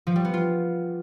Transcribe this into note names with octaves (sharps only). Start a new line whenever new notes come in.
F3
G3
B3
F4